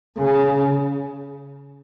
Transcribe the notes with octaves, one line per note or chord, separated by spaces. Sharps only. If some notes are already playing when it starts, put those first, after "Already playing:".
C#3